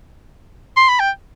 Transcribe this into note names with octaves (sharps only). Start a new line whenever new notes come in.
C6
B5
G5